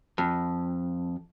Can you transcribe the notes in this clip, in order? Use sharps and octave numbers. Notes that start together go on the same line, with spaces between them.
F2